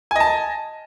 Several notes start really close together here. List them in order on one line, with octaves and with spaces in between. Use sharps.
G#5 D#5 A5